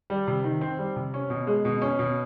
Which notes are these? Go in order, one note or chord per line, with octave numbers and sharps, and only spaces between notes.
G3
C3
D#3
C4
G3
C3
C#4
B2
G#3
B2
C#4
B2